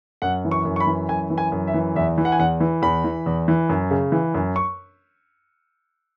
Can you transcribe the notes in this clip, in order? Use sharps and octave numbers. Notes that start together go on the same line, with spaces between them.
F#2 F#5
E3
C#6
F#2
C#6
B5
E3
F#2 G#5
E3
G#5
F#2
E5
E3
E2 E5
E3
F#5
G#5
E2 F#5
E3
E2 B5
E3
E2
E3
F#2
C#3
E3
F#2
C#6